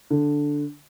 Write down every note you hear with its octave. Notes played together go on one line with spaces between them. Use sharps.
D3